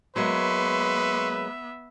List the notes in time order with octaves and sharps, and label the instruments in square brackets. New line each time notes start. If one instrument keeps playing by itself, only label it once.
[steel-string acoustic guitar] F#3 G#3 A#3 [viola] B3 E5 [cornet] B4 [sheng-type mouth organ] C6 C#6